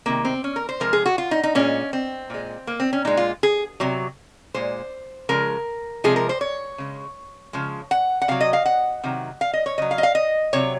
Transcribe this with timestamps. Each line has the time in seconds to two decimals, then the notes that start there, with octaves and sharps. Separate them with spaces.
0.06 C3 D#3 G#3 A#3
0.25 C4
0.44 C#4
0.56 A#4
0.69 C5
0.80 C3 F3 G#3 A#4
0.93 G#4
1.06 F#4
1.18 F4
1.31 D#4
1.43 D#4
1.55 A#2 G#3 C#4
1.93 C4
2.30 A#2 G#3
2.67 A#3
2.80 C4
2.93 C#4
3.05 A#2 G#3 D#4
3.17 F4
3.43 G#4
3.80 C3 F#3
4.54 A#2 G#3 C5
5.29 C#3 F3 G#3 A#4
6.04 C3 F3 G#3 G#4
6.16 A#4
6.29 C5
6.41 C#5
6.78 C#3 G#3
7.53 C#3 F3 G#3
7.91 F#5
8.22 F#5
8.28 C3 F#3 F5
8.41 D#5
8.53 F5
8.66 F#5
9.04 C3 D#3 F#3
9.41 F5
9.53 D#5
9.66 C#5
9.78 C#3 F#3 D#5
9.91 F5
9.98 D#5
10.03 F5
10.15 D#5
10.53 C3 F#3 C#5